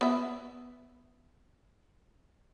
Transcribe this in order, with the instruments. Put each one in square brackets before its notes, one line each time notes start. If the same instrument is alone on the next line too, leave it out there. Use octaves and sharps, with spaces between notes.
[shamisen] B3 E5